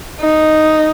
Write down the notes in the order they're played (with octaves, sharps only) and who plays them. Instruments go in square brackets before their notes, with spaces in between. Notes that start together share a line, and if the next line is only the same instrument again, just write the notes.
[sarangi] D#4